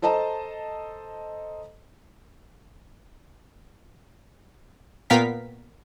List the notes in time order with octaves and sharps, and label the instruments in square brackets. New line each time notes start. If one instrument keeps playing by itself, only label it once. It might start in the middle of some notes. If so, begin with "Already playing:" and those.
[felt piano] A4 C5 D#5 A5 A#5
[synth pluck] A#2 B3 A#4 F5 G5 B6